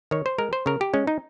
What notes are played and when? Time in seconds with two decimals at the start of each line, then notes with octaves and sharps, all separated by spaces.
0.11 D#3 C#5
0.26 C5
0.38 G#3 A#4
0.53 C5
0.66 C#3 A#4
0.81 G4
0.94 G#3 C#4
1.07 D#4